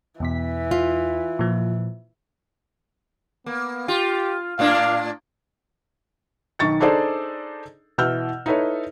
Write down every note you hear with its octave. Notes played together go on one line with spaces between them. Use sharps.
E2 B2 E3 B6
F4
A#2 F3
A#3 B3
F4 G4
A2 A#3 D4 F5
B1 D#3 C#6 A6 C#7
D4 D#4 G#4 A4 C5 D5
B2 E3 E4 E6 F6 G6
D#4 E4 A4 B4 C#5